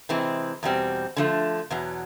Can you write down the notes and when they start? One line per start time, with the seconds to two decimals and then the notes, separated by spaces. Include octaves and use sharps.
0.09 C3 E3 G#3 C4
0.63 E2 B2 G3 C4
1.16 D3 F3 A3
1.70 E2 B2 F#3